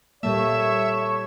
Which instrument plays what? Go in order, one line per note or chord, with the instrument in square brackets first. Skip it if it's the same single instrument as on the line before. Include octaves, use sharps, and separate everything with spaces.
[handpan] A#2 G3 A#3 [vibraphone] G4 A4 A5 [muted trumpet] C#5 [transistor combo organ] E5